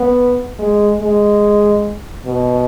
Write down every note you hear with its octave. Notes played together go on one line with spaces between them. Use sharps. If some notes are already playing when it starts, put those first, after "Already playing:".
Already playing: B3
G#3
G#3
B2